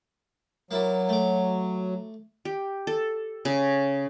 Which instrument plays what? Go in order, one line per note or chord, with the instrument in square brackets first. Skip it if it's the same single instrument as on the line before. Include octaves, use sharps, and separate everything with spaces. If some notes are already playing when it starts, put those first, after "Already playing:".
[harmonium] F#3 [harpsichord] A#3 E4 D5
[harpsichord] A3 D6
[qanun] G4
A4
C#3